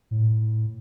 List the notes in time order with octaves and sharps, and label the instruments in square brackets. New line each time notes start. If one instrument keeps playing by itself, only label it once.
[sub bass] A2